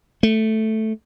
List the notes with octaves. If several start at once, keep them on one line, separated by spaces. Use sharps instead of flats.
A3